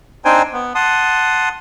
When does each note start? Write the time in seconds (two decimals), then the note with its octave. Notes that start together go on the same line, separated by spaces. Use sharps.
0.25 C4 D4 D#4 C5 G5 G#5
0.53 B3
0.75 F#5 A5 C6 D#6